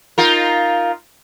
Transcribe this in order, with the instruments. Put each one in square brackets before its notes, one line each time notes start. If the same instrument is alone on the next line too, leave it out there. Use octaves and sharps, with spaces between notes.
[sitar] D#4 F4 A#4